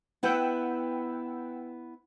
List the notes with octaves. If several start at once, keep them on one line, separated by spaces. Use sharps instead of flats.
B3 E4 B4 F#5 G5 E6